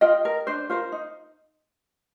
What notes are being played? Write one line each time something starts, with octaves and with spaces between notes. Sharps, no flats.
F4 D#5 G5
A#4
D4 C5
F4 A#4 C5
D#4